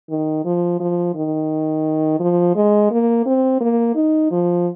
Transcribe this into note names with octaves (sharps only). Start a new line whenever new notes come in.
D#3
F3
F3
D#3
F3
G#3
A#3
C4
A#3
D#4
F3